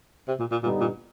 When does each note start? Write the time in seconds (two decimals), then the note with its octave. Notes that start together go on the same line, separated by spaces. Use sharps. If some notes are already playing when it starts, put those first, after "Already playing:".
0.28 C3
0.40 A#2
0.51 A#2
0.63 G2 A#2 D3 G3 B3 D#4
0.80 A#2